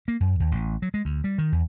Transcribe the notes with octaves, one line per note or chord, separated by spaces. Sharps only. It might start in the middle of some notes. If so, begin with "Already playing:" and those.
A#3
F#2
D#2
A1
F#3
G#3
D2
G3
D#3
E2